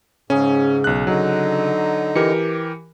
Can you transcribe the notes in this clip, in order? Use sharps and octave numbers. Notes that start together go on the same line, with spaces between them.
G#2 C#3 C#4 G#4
B1 F#6
D3 F#3 D#4
E3 G4 A#4 C#7